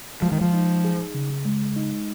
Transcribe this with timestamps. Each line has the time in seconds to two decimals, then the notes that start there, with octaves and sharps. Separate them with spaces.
0.22 F3 G#3
0.32 D#3
0.41 F3
0.53 D#4
0.84 G#4
1.14 C#3
1.45 G#3
1.76 D#4